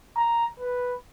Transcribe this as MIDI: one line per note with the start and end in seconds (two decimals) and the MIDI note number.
0.17 0.46 82
0.60 0.95 71